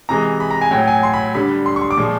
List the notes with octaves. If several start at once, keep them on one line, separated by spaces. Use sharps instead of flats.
C3 E3 G#3 A#5
B5
A#5
G#5
A2 F#3 G5
G#5
C6
B5
D3 G3 B5
C6
C#6
C6
D6
A#2 F3 G#3 C#6